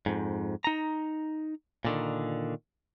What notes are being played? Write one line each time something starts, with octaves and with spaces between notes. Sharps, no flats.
F2 G#2
D#4 A#5
A#2 D3 D#3